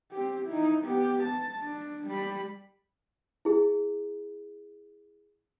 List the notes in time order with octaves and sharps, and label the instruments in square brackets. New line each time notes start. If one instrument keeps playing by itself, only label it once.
[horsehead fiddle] C4 G4
D#4 E4
B3 G4
A5
D4
G3 B5
[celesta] E4 G#4